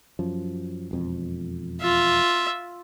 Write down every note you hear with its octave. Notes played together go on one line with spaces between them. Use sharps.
F#2 F3
E1 F2
F4 E5